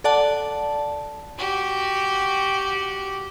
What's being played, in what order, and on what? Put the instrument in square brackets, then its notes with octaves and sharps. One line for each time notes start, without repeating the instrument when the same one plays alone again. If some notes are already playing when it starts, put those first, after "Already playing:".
[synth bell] A4 D5 F#5 A5
[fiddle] F#4 G4